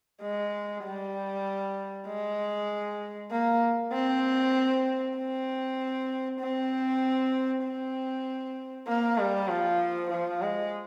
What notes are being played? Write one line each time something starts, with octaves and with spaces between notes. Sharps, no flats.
G#3
G3
G#3
A#3
C4
C4
C4
C4
A#3
G3
F3
F3
G#3